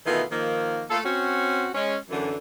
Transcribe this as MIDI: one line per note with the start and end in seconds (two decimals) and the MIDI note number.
0.06 0.24 47
0.06 0.24 51
0.06 0.24 52
0.06 0.24 57
0.06 0.24 59
0.06 0.24 65
0.32 0.84 51
0.32 0.84 53
0.32 0.84 58
0.90 1.00 57
0.90 1.00 58
0.90 1.00 65
0.90 1.00 69
1.05 1.69 60
1.05 1.69 61
1.05 1.69 66
1.74 1.96 56
1.74 1.96 61
2.10 2.36 42
2.10 2.36 50
2.10 2.36 52